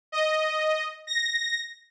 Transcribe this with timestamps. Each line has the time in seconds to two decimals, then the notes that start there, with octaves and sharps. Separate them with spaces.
0.12 D#5
1.07 A#6